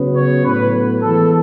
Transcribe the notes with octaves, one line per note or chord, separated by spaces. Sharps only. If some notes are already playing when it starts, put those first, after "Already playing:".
Already playing: C#3 F#3 B3
C#5
A2 F#3 B3 B4
B4
E3 G#3 B3 A4